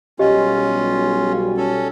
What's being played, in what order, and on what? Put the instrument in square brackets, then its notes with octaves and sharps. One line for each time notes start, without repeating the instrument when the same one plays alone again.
[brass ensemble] B1 B2 G3 [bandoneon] C#4 F4 [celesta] G4 D#5
[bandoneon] C#4 A4